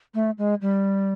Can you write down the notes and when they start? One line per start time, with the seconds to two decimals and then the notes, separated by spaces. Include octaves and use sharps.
0.14 A3
0.38 G#3
0.61 G3